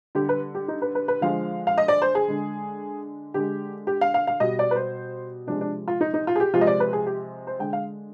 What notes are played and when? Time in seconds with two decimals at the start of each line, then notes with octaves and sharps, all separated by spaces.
0.15 D3 G4
0.20 G3
0.29 B4
0.55 G4
0.68 D#4
0.82 B4
0.95 B4
1.08 B4
1.21 D3 F3 G#3 F5
1.67 F5
1.78 D#5
1.88 D5
2.02 C5
2.15 G#4
2.28 D3 G#3
3.34 D3 G#3 G4
3.87 G4
4.01 F5
4.14 F5
4.27 F5
4.40 B2 G3 D#5
4.59 D5
4.71 B4
4.76 C5
5.47 C3 F3 G#3 D4
5.61 D4
5.88 F4
6.01 D#4
6.14 D#4
6.27 F4
6.36 G#4
6.40 G4
6.53 C3 F3 G#3 F4
6.61 D#5
6.67 D5
6.80 B4
6.93 G#4
7.06 G4
7.47 C5
7.59 D3 G#3 G5
7.73 F5